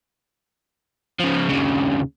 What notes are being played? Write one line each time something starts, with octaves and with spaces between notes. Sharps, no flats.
C#3 F3
D#2 C#3